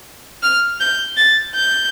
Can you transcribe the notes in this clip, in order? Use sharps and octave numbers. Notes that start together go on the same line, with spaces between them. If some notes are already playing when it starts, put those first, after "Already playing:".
F6
G6
A6
G6